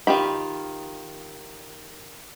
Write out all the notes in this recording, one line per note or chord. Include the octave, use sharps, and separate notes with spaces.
D#3 F4 G4 B5